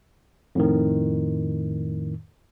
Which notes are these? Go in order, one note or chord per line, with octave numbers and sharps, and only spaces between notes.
F2 A2 D#3